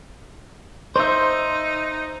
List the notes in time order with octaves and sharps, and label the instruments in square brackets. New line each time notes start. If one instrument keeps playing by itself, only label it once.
[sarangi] D#4 [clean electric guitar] C5 E5